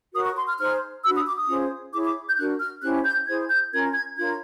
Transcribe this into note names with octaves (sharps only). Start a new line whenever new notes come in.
F#4 A#4 C#5 D#6
C#6
C6
F6
D#4 G#4 C5 F6
D4 F#4 B4 E6
D#6
D6
D#6
C#4 F4 G#4 C5
E4 G#4 C#5 D6
D6
G6
D4 F#4 A#4 F#6
F6
C#4 E4 G4 C5 F#6
G6
E4 G#4 C5 G#6
G6
C#4 F4 A#4 G#6
G#6
D4 F4 A#4 C#5 G#6